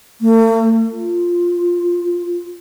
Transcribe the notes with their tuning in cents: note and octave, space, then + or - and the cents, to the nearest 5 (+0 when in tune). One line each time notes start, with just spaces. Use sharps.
A3 +45
F4 +0